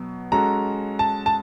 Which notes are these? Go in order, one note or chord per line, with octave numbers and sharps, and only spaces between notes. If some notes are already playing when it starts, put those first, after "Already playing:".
Already playing: B2 F#3 B3
G#3 C#4 F#4 A4 A#5
A5
A5